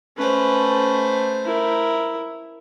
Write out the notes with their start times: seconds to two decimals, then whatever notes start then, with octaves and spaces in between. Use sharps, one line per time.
0.17 A3 C#4 B4 C5
1.45 E4 A#4